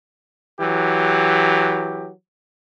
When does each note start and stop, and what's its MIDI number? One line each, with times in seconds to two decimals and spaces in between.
0.60 2.10 52
0.60 2.10 54
0.60 2.10 67